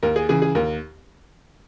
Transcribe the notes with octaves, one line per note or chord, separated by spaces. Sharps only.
D#2 A#4
G#4
C#3 E3 G#4
G#4
D#2 A#4